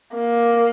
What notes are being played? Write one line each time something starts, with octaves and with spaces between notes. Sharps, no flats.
A#3